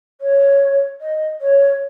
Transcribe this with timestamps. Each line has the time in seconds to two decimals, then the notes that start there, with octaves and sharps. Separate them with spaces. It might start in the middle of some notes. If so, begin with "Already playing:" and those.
0.20 C#5
1.01 D#5
1.41 C#5